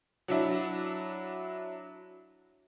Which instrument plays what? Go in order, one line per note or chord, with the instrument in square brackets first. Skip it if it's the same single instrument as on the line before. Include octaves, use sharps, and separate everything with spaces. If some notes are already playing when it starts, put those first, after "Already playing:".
[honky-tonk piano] F#3 D4 E4